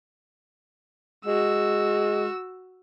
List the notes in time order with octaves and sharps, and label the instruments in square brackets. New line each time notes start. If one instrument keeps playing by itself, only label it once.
[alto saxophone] G#3 [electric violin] F#4 E6